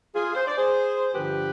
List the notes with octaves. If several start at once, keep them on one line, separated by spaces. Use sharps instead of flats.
F4 G#4
C5
D5
G#4 C5
G2 D3 F3 G4 B4